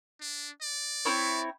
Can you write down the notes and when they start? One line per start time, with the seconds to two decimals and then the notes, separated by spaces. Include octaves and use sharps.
0.21 D4
0.62 D5
1.05 C4 E4 C#5